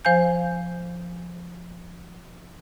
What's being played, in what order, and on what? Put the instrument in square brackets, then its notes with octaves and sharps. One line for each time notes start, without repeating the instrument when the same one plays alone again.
[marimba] F3 C5 F5 G#5 G6